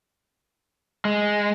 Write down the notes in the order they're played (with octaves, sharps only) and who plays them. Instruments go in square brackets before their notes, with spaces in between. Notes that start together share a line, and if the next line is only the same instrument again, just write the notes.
[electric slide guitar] G#3